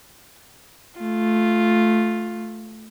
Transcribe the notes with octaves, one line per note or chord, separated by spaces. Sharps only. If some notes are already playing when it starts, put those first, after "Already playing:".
A3 F4